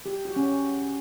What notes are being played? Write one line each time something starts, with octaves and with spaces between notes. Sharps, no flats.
G4
F#4
C#4